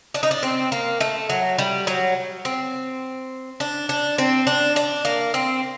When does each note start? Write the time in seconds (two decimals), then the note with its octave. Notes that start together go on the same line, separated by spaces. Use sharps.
0.14 D4
0.23 D#4
0.31 D4
0.43 C4
0.72 A#3
1.00 A3
1.30 F#3
1.58 G3
1.87 F#3
2.45 C4
3.60 D4
3.89 D4
4.18 C4
4.47 D4
4.76 D4
5.05 A#3
5.34 C4